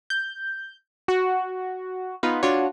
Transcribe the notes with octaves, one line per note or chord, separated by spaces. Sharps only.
G6
F#4
B3 D#4 F4 B4
D4 F4 F#4 C#5